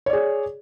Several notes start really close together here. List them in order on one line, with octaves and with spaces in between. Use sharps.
C#5 D5 G#4